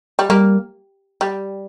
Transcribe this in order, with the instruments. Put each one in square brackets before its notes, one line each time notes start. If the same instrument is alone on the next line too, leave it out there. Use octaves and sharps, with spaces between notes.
[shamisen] G3
[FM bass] G3 [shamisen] A#3
[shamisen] G3